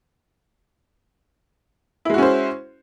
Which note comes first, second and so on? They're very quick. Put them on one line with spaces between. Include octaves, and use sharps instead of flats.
E4 G#3 F#4 C#4 C5